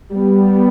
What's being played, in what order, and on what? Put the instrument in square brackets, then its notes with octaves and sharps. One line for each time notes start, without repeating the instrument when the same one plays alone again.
[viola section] G3 B3